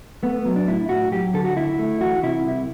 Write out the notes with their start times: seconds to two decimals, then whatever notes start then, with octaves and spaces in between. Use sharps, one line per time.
0.23 A3 B3
0.34 B3
0.45 F#3
0.56 D4
0.67 A2 E4
0.89 A2 F#4
1.11 F#3 G4
1.33 D3 A4
1.45 F#4
1.56 D2 E4
1.79 A3
2.01 E3 F#4
2.23 C3 E4
2.45 C2